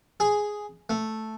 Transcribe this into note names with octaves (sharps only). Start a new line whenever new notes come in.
G#4
A3